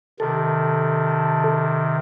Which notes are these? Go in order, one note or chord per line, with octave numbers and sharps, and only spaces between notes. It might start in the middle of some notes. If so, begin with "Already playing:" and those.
C3 D#3 A4